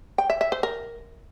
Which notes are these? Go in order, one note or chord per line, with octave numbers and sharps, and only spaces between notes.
G5
E5
E5
C5
A#4